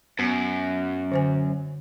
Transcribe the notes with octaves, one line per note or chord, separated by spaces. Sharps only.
F#2 B3
D3 C5 G#5